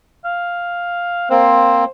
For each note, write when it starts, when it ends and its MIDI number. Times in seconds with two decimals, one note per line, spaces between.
0.25 1.29 77
1.30 1.84 58
1.30 1.84 60
1.30 1.91 72